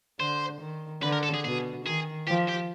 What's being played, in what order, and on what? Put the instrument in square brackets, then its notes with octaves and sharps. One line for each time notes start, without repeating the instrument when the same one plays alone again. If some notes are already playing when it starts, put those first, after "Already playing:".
[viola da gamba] D3 [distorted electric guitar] C5
[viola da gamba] D#3
[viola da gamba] D3 [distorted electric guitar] B4
[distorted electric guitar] A#4
A4
G#4
[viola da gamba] B2 [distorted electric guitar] G#4
[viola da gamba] D#3 [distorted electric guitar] G#4
[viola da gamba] F3 [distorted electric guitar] G4
[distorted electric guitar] G4